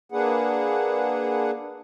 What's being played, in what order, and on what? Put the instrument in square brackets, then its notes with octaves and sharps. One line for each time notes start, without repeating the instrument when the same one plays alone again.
[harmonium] A#3 D4 G#4 B4 F#5